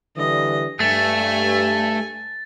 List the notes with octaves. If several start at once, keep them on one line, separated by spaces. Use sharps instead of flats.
D3 E3 G3 D#5
G2 A3 G#5 A6